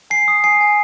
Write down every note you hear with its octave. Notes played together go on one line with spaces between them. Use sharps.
G#5 C7
D#6
G#5 C7
G#5